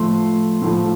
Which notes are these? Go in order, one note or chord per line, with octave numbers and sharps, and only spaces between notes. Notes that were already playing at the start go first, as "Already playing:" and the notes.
Already playing: A2 F3 A3 C6
A2 F3 A3